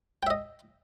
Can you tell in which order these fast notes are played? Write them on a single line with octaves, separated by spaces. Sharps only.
G5 E5 D#5